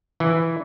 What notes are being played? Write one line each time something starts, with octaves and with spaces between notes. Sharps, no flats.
E3